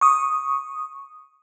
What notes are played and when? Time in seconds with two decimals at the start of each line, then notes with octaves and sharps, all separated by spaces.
0.01 C#6 D#6